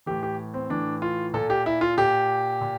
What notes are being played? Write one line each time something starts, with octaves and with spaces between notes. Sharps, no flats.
A2 E3 G4
G4
C4
A2 E3 D4
F4
A#2 A4
G4
E4
F4
A#2 G4
A#2